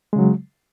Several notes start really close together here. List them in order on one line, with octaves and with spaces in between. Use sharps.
G#3 C#3 F#3